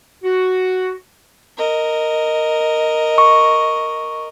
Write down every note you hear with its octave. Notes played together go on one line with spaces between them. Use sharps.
F#4
A#4 D#5
C#6